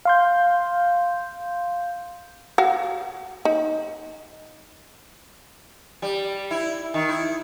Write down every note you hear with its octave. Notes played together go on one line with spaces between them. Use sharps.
F5 C6 G6
F#4 F5
D#4
G3
E4
D#3
E4